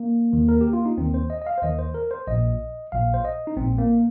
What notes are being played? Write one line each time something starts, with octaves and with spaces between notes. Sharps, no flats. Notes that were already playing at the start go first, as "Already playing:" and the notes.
Already playing: A#3
D#2 D#3
A#4
G4
F4
D#4
D#2 D#3 C4
C5
D#5
D#5
F5
C5
D#2 D#3 D#5
C5
A#4
C5
A#1 A#2 D#5
A#1 A#2 F5
C5
D#5
D#4
A#1 A#2 C4
A#3